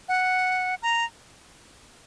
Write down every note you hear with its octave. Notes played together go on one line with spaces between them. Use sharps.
F#5
A#5